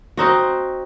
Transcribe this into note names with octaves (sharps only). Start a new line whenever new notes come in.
C4 D#4 F#4